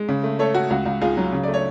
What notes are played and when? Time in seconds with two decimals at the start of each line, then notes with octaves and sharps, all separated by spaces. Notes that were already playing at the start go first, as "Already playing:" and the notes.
Already playing: G#3
0.09 C#3
0.23 A3
0.39 A3 A4 C#5
0.54 A3 F#4
0.70 C#2 F#4
0.86 C#2
1.02 C#2 F4 G#4
1.17 F#3
1.33 C#3
1.43 A3 D5
1.54 C#5